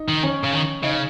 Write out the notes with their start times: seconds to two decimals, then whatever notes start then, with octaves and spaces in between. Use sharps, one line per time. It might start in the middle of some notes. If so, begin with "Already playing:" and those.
Already playing: D#4
0.09 D#3
0.23 C#4
0.44 C#3
0.53 D#3
0.83 C#3 D#4